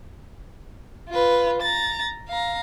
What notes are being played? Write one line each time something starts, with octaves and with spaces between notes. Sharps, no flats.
F4 B4
A#5 A6
F5 A#5